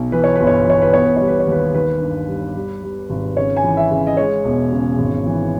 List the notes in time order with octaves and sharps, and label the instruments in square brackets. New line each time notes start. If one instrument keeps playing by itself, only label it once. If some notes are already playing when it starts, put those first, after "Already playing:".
Already playing: [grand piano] B1
E3 B4
C#5
G1 B4
C#5
B4
E3 C#5
B4
B3 C#5
B4
G3 C#5
B4
C#5
D#2 B4
D#3 B4
G2
G3
G3
G3
G#1
C#3 C#5
G#5
E3
E5
C#3
D#5
G#3 C#5
E1
C#3
G#1
E3